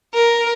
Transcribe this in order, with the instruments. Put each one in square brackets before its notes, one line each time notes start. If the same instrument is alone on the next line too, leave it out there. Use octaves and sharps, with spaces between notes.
[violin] A#4